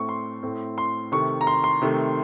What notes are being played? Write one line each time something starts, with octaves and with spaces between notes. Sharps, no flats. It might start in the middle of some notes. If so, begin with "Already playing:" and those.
Already playing: A2 A3 C4 C#6
C6
A2 A3 C4
C6
C3 D#3 A3 C#6
A#5
C6
C6
C3 D#3 A3